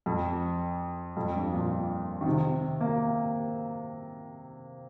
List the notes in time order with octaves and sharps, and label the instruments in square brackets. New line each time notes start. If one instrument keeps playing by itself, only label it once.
[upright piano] F2
F2
G2
A#2
D#3
C3
A#3